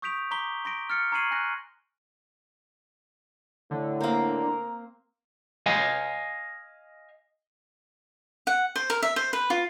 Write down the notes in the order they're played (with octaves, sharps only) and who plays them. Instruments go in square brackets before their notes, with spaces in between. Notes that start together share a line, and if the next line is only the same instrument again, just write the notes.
[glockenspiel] C#6 D#6 G6 B6 D7 F7
A#5 C6 D6 B6 G7
C6 A#6 D7
F6 A6 C#7
A#5 C#6 G#6 C7 D#7 F#7
G#5 F#6 A#6
[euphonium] A2 [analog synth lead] D3
[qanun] A#3 C4 [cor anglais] A#4
[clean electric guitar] D#5 F5 G#5
[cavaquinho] F#5
C5
A#4
E5
C5
B4
F4